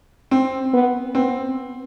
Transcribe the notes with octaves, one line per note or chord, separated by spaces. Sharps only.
C4
B3
B3 C4